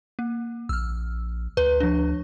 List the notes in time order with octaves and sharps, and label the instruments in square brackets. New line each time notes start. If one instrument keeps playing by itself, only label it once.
[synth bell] A#3
[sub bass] A#1 [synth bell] E6 F6
[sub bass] D2 [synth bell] B4
[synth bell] F3 D4